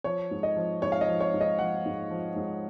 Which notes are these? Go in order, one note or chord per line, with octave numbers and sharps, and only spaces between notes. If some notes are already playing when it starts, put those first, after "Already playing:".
F3 C#5
G#2
D#5
F3
G#2 C#5
F5
D#5
F3
C#5
G#2
D#5
F3 F#5
G#2
F3
G#2